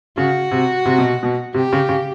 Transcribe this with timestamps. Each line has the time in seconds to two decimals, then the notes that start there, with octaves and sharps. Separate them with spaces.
0.17 C#3 F#4
0.51 C3
0.85 C3
0.98 B2
1.23 B2
1.54 C3 G4
1.73 C#3
1.89 C#3